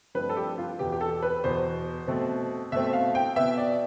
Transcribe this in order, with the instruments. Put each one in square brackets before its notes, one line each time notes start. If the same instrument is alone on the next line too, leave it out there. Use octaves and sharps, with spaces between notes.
[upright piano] G2 F3 A3 C4 B4
A4
G4
F4
E2 B2 B3 G4
G4
A4
B4
E2 B2 B3 C5
B2 A3 C4
B2 A3 C4 E5
F5
G5
B2 B3 E5
D5